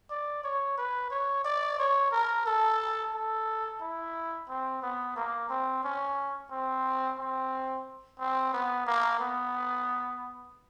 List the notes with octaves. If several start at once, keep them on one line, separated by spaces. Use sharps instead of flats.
D5
C#5
B4
C#5
D5
C#5
A#4
A4
A4
E4
C4
B3
A#3
C4
C#4
C4
C4
C4
B3
A#3
B3